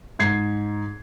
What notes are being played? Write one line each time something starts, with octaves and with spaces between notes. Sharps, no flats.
G#2 G#6 C7